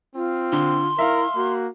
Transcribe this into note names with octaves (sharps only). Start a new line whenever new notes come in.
C4 F4
D3 C6
E4 A#4 E5 F5
A#3 F#4